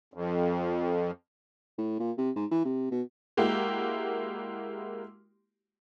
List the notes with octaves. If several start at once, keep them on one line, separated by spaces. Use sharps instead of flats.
F2
A2
A#2
C3
G#2
E3
C3
B2
G#3 A#3 E4 F#4 G4